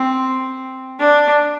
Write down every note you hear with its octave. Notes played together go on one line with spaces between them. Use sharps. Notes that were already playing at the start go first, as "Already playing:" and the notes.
Already playing: C4
D4